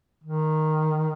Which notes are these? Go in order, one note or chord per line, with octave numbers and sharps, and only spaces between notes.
D#3